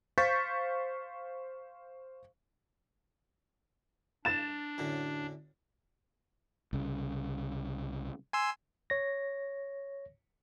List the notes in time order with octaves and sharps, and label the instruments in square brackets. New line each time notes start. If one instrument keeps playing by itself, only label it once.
[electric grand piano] C5 F5 C#6 G6 A6 B6
[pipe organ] D4 [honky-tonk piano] A6 E7
[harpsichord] F#2 A2 D3
[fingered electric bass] C2 C#3
[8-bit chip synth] G#5 C6 E6
[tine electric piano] C#5 A#6